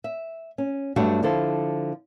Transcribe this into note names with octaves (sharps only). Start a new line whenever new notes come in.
E5
C#4
G2 F#3 G3 A3 D4 F#4
D3 F3 E4 A4 C5